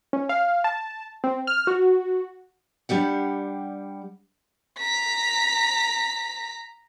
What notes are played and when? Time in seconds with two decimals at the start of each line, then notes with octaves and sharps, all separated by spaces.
0.13 C#4
0.29 F5
0.64 A5
1.24 C4
1.47 F6
1.67 F#4
2.89 G3 D4 G4 F#5
4.79 A#5 B6